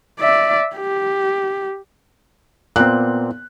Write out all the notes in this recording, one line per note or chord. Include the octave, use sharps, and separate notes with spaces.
D5 E5
G4
A#2 B3 C4 F#6